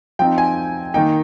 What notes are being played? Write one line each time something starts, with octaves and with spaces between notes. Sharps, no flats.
F3 C4 D#4 G5
G#5
D#3 A#3 D#4 G5